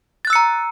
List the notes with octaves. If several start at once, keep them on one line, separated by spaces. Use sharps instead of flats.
A#5 E6 F#6 A6 C#7